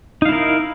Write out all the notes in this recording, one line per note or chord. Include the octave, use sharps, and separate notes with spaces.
D#4 E4 A#4 F5